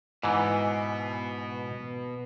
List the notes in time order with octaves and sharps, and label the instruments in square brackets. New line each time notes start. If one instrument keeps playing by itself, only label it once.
[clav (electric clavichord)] G#2 E3 [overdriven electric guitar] B2 B3